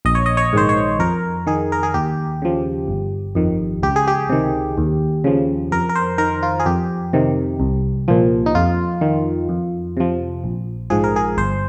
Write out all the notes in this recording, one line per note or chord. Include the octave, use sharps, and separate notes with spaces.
A#1 D#5
C#5
D#5
C#5
G#2 D#3 C5
C#5
F2 A#4
D#3 G#4
A#4
G#4
D#2 G4
C#3 F3
G1
F2 D#3
C#2 G4
G#4
G4
C3 D#3
D#2
C#3 F3
F2 A#4
A#4
C5
D#3 A#4
F4
G#4
F2 G4
C3 D#3
C2
A#2 F3
D#4
F2 F4
D#3
F2
C3 F3
A#1
G#2 F3 G#4
A#4
G#4
G1 C5